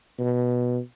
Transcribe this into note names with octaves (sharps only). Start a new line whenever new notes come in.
B2